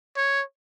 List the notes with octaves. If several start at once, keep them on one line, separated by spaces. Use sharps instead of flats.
C#5